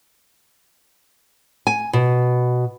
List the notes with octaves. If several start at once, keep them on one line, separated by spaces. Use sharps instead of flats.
G#5
B2